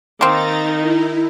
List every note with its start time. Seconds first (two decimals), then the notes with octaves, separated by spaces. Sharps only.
0.21 D#3 A#3 C4 D#4 A#4 A#5 A6
0.81 E4